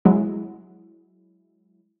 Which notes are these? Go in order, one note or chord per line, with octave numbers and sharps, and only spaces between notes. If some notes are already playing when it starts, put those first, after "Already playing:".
F#3 G#3 E4